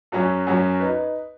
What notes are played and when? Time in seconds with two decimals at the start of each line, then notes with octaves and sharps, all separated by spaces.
0.12 F#2 F#3 C#4
0.47 F#2 F#3 C#4
0.80 D#4 B4